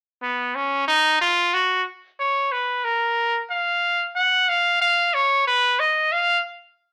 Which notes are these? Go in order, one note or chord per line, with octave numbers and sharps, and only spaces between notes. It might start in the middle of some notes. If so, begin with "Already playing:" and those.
B3
C#4
D#4
F4
F#4
C#5
B4
A#4
F5
F#5
F5
F5
C#5
B4
D#5
F5